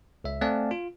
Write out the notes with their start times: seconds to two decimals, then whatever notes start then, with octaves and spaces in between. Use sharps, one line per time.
0.24 C#2 E5
0.41 A3 C4 D5 F5 G#5 A5
0.71 F4